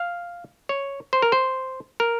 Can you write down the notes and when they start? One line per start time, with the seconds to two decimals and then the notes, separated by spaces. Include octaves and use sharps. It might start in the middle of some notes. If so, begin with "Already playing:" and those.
Already playing: F5
0.69 C#5
1.13 C5
1.22 A#4
1.32 C5
2.00 A#4